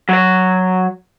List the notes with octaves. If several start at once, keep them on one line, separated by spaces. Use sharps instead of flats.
F#3 C#5